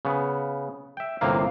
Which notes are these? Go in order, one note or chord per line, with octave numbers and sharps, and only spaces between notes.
C#3 B3
E5 G5
G1 A2 C3 A#3 A#4 F5